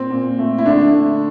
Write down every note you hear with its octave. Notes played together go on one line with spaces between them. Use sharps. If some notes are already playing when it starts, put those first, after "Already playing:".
Already playing: A#2 C4
A#2
A3
E4
D3 D4
A3